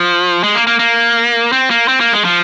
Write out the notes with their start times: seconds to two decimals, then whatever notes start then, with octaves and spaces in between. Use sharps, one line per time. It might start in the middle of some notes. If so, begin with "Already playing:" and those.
Already playing: F3
0.43 G#3
0.55 A#3
0.67 A#3
0.79 A#3
1.52 C4
1.71 A#3
1.88 C4
2.00 A#3
2.13 G#3
2.25 F3